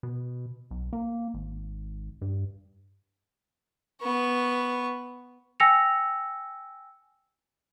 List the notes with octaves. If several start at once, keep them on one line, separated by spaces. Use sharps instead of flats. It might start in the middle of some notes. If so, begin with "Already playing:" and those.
B2
B1
A#3
G#1
G2
B3 C#6
G5 G#5 E6 A#6 C#7 F7